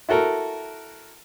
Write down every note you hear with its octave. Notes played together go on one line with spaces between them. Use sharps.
E4 F#4 A4 A#4